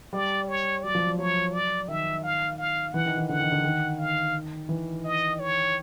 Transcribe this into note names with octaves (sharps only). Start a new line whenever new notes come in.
G3 D5
C#5
F#3 D5
F3
F#3
F#3 C#5
D5
D#3 E5
F5
F5
E3 F#5
D#3
D#3
D3 F#5
D#3
D3
D#3
F5
E3
D#5
C#5